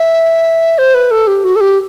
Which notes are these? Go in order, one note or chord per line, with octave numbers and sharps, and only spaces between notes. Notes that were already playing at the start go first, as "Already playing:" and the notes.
Already playing: E5
C5
B4
A4
G4
F#4
A4
G4